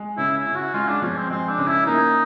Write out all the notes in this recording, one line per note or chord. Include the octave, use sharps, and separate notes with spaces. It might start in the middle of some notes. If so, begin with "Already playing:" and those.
Already playing: G#3
C#3 E4
E4
C#3
F#4
G#3 F4
D4
F3 C#4
C4
G#3 C4
D4
C#3
E4
A#3 D#4